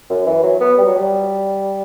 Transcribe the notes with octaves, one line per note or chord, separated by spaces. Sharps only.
F#2
E3
F#3
B3
G3
F#3
G3